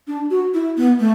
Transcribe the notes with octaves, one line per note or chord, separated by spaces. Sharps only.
D4
F#4
E4
B3
A3